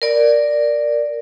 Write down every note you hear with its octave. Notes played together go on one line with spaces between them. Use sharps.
A#4 D5